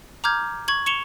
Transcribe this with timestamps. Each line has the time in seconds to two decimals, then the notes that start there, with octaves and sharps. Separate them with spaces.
0.24 A#5 D6 F6 G6 G#6
0.68 C#6 G#6 F#7
0.86 C#6 C#7 E7 F7 G7